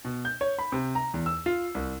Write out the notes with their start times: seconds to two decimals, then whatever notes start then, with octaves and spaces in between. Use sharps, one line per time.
0.05 B2
0.25 G6
0.41 C#5
0.58 B5
0.72 C3
0.95 A#5
1.14 E2
1.26 E6
1.46 F4
1.75 C2